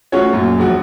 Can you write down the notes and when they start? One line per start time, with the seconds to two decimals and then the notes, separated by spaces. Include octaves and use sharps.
0.12 A3 C#4 F4 F#4 C#5
0.33 F#2 A#2
0.58 E1 A#1 F#4